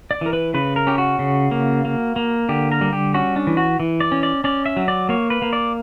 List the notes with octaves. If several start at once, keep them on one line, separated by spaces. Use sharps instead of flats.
D5
E3 A#4
B4
C#3 B4
A#4
C#4 G4
F#4
C#3
A#3
A#3
A#3
D3 G4
A#4
G3
G4
C#4 F#4
D4
E3
F#4
E3
D5
C#4
D5
C#4 D5
E5
F#3
D5
A#3 C#5
B4
A#3
D5